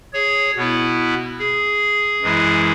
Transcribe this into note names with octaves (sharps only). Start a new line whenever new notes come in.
G#4 C#5
B2 B3 E4
G#4
F#2 E3 G#3 E4